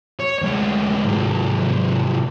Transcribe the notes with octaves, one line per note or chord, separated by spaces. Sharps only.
C#5
D2 G#3
G#2 C3